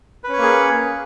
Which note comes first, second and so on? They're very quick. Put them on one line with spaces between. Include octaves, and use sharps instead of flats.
B4 C#4 C#5 A#3 G#4